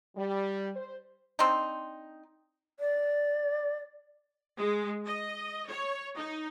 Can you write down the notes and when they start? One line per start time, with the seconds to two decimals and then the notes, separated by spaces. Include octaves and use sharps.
0.16 G3
0.76 C5
1.39 C4 D4 D#4
2.80 D5
4.59 G#3
5.06 D#5
5.69 C#5
6.17 D#4